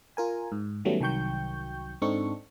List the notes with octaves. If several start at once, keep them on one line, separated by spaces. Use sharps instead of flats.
F4 A#4 G#5
G#2
D#3 F#3 G3 A3 B3 C#4
C2 D#3 F#3 G5 C#6 G6
G#2 C4 D4 D#4 A4 C#6